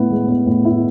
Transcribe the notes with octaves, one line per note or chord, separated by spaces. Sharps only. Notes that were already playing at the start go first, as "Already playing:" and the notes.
Already playing: A2 B3 E4
G#3
B3
A2
E4